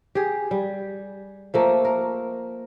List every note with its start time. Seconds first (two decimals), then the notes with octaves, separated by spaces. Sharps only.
0.15 G4 G#4
0.51 G3
1.54 F3 A3 A#3
1.85 A#4